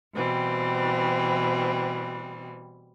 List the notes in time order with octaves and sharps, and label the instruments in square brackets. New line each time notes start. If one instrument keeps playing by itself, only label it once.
[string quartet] B2 E3 G3 C4